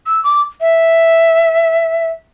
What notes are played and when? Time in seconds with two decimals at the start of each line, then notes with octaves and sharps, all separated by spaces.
0.06 E6
0.24 D6
0.61 E5